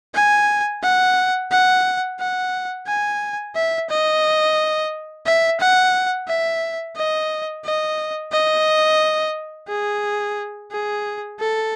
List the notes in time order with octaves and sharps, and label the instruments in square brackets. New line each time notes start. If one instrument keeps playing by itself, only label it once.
[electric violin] G#5
F#5
F#5
F#5
G#5
E5
D#5
E5
F#5
E5
D#5
D#5
D#5
G#4
G#4
A4